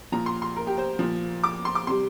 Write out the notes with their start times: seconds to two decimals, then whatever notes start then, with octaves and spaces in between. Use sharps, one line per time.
0.12 A#2 F3 A#5
0.26 C6
0.42 C6
0.56 A#4
0.67 G4
0.78 C5
0.99 A#2 F3
1.44 D6
1.65 C6
1.75 D6
1.87 C3 G3 C6